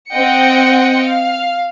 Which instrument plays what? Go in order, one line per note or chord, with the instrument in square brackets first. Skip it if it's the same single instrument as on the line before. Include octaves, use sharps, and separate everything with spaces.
[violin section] C4 D#5 F#5 G5 C#7
F5